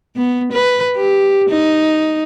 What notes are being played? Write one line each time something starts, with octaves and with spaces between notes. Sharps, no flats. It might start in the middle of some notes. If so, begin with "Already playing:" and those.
B3
B4
G4
D#4